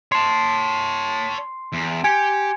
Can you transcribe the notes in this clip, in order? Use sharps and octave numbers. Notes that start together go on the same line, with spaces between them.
C#5 A5 C6 C7
E2
G4 G#5 G#6 C#7